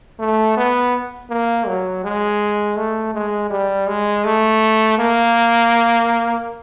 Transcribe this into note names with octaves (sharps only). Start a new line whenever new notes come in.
A3
B3
A#3
F#3
G#3
A3
G#3
G3
G#3
A3
A#3